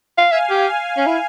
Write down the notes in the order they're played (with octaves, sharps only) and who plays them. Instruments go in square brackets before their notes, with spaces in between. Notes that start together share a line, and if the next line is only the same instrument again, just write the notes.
[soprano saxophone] F5
[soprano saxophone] E5 [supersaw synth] F5 G#5
[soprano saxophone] G4
[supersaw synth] F5 G#5
[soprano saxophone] C#4
E4